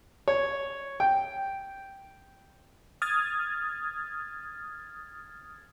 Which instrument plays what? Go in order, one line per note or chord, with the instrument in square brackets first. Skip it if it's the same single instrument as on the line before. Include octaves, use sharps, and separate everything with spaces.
[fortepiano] C#5
G5
[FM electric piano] D#6 F6 G#6 A6